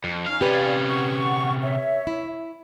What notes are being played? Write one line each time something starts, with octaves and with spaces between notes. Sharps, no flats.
F2
C#4 D#4 F5 F6
C3 C#4 G4 B4 D5 F5
F#5 C#6
C#5 E5
E4